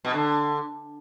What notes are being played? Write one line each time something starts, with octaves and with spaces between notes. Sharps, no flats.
B2
D3